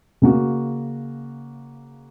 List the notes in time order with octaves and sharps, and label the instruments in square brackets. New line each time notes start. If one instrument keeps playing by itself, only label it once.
[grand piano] C#3 A#3 F#4